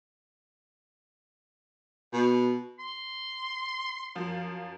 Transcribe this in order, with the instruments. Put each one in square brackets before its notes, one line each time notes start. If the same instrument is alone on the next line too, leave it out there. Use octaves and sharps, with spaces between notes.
[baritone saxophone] B2
[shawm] C6
[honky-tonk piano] F#2 F3 F5